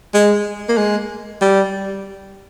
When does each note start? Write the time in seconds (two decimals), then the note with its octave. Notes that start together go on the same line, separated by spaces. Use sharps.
0.14 G#3
0.69 A#3
0.77 G#3
1.41 G3